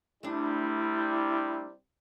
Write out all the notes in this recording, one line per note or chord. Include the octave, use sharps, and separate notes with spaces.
C3 G3 A3 D4 E4